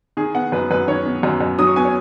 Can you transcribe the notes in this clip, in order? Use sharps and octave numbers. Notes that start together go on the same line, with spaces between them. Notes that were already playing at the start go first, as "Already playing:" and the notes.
D#3 G#4
B3 F#5
F#2 B4
F#2 B4
D#3 C#5
B3
F#2
F#2
F#3 D#6
C#6
B3 G#5
C#5